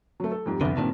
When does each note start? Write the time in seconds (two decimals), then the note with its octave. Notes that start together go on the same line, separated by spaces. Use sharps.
0.20 F#3 A3
0.32 A4
0.46 F2 G#2 G3
0.61 C2 F2 D3 B3
0.77 G2 A#2 D#3 C4 D4